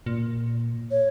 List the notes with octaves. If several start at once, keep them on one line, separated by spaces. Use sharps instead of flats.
A#2
C#5